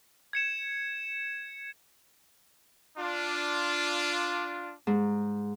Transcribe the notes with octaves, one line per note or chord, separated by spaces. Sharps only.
G#6 C#7 E7
D4 F4
G#2